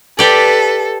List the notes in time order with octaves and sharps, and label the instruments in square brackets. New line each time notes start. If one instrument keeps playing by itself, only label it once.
[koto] G4 D5 [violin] A4 [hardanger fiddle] B4